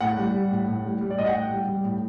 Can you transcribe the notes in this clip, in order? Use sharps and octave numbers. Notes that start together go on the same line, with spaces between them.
A2 F#5
G3
G3
A2
A2
G3
G3
D5
A2 D#5
F#5
A2 G5
G3
G3
A2